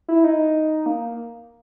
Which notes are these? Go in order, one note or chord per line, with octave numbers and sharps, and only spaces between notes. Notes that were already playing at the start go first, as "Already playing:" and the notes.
E4
D#4
A#3